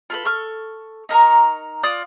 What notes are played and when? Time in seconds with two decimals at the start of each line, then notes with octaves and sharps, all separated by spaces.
0.10 F4 A4 B4
0.25 A4 C#6 F6
1.09 D#4 A#4 A#5 C#6
1.83 F4 D5 D#6 F#6